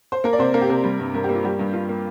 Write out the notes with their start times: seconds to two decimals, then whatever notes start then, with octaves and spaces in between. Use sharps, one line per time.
0.12 C5
0.24 A#3 A#4
0.33 D5
0.39 C3 C5
0.54 A#3 A#4
0.62 G4
0.69 C3 A#4
0.84 G3
1.00 G2
1.14 G2 A#4
1.24 A#3 G4
1.35 F4
1.44 G3 G4
1.59 G2
1.73 G2 F4
1.89 A#3